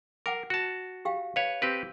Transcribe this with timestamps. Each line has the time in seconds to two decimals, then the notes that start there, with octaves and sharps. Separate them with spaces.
0.26 A#4 F#5 G5 D6
0.50 F#4 A5
1.05 G4 F5 G5
1.36 B4 C#5 F5
1.62 C4 G4 B4